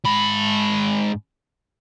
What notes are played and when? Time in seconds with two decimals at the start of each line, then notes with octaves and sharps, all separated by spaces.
0.05 G#2 B5